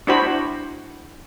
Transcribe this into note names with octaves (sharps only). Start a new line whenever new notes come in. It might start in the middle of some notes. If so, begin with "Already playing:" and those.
D4 E4 F#4 C5 G5 B5